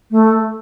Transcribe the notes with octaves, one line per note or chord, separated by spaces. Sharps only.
A3